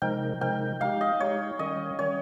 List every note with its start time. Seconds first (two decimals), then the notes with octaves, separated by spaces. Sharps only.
0.02 C3 F3 G#3 D#4 A#4 G5
0.41 C3 F3 G#3 D#4 A#4 G5
0.81 G#3 D#4 G4 F5
1.01 D#5
1.20 G#3 D#4 G4 C#5
1.59 D#3 G3 C#4 D#5
1.99 D#3 G3 C#4 C#5